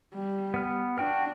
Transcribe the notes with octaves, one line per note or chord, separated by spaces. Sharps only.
G3
B3 F6
D4 F#4 G5 F6